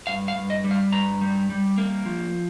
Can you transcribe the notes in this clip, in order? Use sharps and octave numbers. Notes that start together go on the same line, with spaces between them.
G2 F5
F5
G2
D#5
G3
F5
G2 A#5
G3
G3
A#3
F3